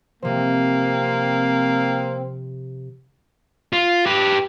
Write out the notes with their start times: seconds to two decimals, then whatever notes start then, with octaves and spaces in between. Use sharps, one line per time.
0.22 C3 F3 A#3 C4
3.73 F4
4.06 G4 B4